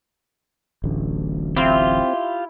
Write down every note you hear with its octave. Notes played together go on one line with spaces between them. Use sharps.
D1 A1 D2
C4 E4 F4 G4